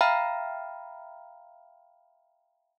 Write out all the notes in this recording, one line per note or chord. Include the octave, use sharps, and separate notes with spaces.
E5 F5 G5 A#5 B5 F6